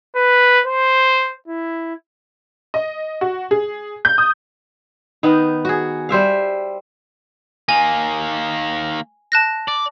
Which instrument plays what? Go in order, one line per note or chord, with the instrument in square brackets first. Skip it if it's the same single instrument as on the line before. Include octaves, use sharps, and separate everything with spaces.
[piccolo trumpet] B4
C5
E4
[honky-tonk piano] D#5
F#4
G#4
G6
D#6
[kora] D#3 B3 D#4
F#4 G#4
G3 C5 E5 F5
[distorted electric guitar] D#3 A#3 [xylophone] G#5
[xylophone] A5 F#6 A#6
[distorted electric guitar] D5